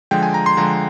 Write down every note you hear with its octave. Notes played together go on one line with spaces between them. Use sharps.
D3 F3 G#3 G5
G#5
A#5
C6
D3 F3 G#3 A#5